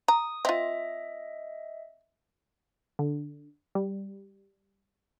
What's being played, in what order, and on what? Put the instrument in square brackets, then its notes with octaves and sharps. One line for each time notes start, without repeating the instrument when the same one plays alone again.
[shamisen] A#5 [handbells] D#6
[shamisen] C4 F4 [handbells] D#5 E5
[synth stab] D3
G3